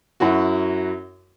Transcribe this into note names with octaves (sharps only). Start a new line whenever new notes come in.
F#2 E4 F#4